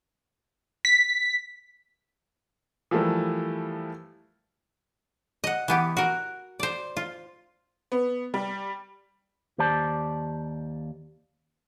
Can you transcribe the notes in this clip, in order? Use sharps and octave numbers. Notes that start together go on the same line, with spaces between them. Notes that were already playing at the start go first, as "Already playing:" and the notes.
B6
E3 F3 G3 A3 A#4
D#5 F#5
E3 B3 G4
F#4 A#4
C5 D5
F4
B3
G3
D#2 G4 C5 D5 A5